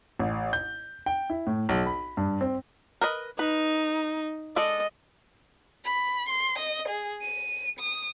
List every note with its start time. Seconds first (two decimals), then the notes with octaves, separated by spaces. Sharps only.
0.19 A1
0.53 G6
1.06 G5
1.30 E4
1.47 A2
1.69 B1
1.86 B5
2.17 G2
2.41 C4
3.01 A#4 B4 D#5
3.39 D#4 B4
4.56 G#3 A4 D5 D#5
5.85 B5
6.29 C6
6.59 D#5
6.89 G#4
7.21 D#7
7.79 D#6